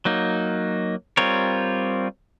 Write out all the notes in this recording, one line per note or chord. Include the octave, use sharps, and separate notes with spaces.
F#3 A#3 D#4
G3 C4 F4 A#4 C#5